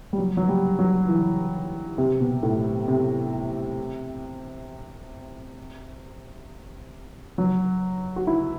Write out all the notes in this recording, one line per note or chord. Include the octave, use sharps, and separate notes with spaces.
G3
F#3
F#3
G3
F#3
E3
C3
B2
A2
C3
F#3
F#4
E4